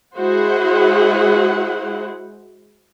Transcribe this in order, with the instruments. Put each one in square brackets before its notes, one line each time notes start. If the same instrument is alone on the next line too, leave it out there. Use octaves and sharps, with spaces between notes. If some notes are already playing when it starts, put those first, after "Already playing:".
[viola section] G#3 E4 F#4 G#4 C5 F#5